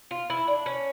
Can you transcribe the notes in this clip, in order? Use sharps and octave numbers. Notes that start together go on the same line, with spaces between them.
F4
E4
D4
C#4